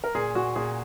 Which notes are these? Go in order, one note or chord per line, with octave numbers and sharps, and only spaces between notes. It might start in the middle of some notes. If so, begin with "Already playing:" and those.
A#4
A#2 G#4
A#2 F#4
A#2 G#4